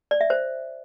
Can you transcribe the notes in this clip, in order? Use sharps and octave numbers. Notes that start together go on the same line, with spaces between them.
D5
E5
C5